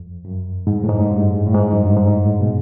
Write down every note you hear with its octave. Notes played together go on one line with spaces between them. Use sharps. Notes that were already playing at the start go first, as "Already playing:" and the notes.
Already playing: F2
F#2
G#2
A2
G#2
G2
A2
G#2
F#2
G2
G#2
A2
B2